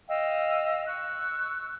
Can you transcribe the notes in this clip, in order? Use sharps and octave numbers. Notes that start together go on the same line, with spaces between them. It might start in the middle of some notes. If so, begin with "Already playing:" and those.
D#5 F5 G5 E6
C#6 E6 F#6